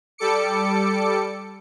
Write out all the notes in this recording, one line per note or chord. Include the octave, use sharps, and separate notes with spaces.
G3 A4 D6 C#7